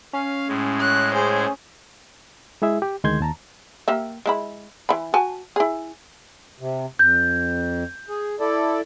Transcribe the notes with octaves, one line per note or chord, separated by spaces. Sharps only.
C#4 F5
A2 G#3
F#6
G#4 C5
G#3 E4 G#4 E5
G4
D2 D#3 G#3 C6 G6 G#6
D#2 A5 A#5
A#3 G4 E5
G#3 E4 B5
E3 B5
F#4 G#5 A5
E4 G#4
C3
F2 G6
G#4
E4 A4 D5